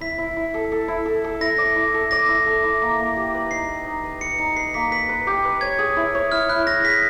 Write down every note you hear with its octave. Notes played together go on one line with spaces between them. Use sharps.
E4 B6
E4
E4
A4
A4
E4
A4
A4
E4 A#6
D5
E4
A4
D5 A#6
E4
A4
E4
A#3
A#3
G4
B4
D#4 C7
B4
D#4
B4
B4 C#7
D#4 C#7
B4 C7
A#3 B6
B4 B6
B4
G4
B4
C#5 G#6
G#4
E4
C#5
E4 F6
E4 F#6
E4 A#6
G#4 B6